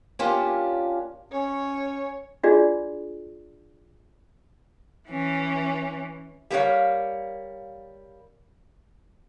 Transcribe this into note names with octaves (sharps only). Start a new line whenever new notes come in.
A#3 C#4 D4 F4 G4
C#4 C#5
D4 F4 F#4 G#4 D5
E3 C#4
G3 A#3 C#4 G4 C#5 F5